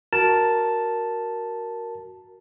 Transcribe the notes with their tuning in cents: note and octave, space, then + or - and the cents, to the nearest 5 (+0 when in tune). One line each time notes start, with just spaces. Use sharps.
F#4 +5 A#4 +0 A5 +0